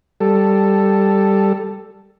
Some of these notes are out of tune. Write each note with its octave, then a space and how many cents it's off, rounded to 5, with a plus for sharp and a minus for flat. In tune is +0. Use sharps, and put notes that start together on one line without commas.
G3 +0 A4 +0